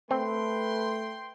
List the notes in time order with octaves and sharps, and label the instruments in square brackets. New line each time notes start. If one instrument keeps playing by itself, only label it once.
[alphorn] A3 [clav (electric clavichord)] C4 [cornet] B4 [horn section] G5 C6